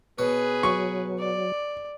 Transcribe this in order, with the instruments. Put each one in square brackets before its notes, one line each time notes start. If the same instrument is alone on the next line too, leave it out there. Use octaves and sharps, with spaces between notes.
[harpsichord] B2 C#5 [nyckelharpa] G#4 B4
[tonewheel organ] F#3 [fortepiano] C#6
[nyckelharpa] D5